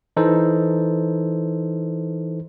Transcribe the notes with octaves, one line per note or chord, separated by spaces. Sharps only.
E3 D#4 A4 C5